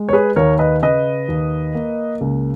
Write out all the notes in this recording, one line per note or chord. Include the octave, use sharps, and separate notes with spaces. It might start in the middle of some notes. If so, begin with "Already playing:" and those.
Already playing: G#3
C#5
G#4 B4
D#2 A#4 C#5
B4 D#5
C#3 B4 D#5
D#2
A#3
C#2